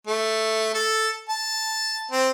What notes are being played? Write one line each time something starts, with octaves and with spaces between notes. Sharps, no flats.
A3
A4
A5
C4